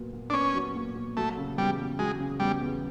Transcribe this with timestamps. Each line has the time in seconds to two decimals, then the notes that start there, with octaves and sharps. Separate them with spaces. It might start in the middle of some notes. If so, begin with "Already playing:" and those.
Already playing: A#2 F#3 B3
0.13 A#2
0.30 D4
0.34 B3 C#4
0.54 F#3
0.75 A#2
0.95 A#2
1.17 F#3 A3
1.37 C#3
1.58 E2 G3
1.78 E2
1.99 F#3 G#3
2.20 C#3
2.40 E2 G3
2.61 E2